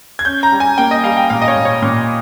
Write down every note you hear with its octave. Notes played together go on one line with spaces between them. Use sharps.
G#6
C#4 G6
A#5
G3
G#5
A#3 G5
D#5
G3 F5
G5
A#2 F5
D#5
C#5
A#2
C#5
A#2